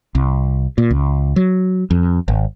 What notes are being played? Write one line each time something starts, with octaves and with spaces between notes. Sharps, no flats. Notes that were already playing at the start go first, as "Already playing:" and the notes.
C2
A#2
C#2
F#3
F2
G#1